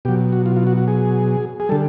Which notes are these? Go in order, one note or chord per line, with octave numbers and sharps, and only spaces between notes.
B2 F#3 G4
F#4
F4
F4
F#4
F#4
G#4
G#4
D3 G3 A4